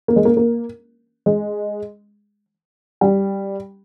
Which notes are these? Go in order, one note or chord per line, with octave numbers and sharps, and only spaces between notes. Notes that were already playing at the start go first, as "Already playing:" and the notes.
A#3
G#3
A#3
A#3
G#3
G3